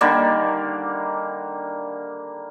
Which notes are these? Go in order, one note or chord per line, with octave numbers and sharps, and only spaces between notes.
D3 D#3 G3 A#3